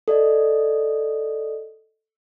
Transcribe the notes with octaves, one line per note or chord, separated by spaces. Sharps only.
A4 D5 D#5